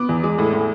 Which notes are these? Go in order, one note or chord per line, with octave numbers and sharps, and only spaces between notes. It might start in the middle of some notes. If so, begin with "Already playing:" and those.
Already playing: B3 D6
E2
G#3
A2
A2